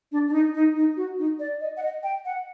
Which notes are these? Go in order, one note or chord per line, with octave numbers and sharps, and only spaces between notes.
D4
D4
D#4
D#4
D#4
F#4
D#4
D5
D#5
F#5
D#5
G5
F#5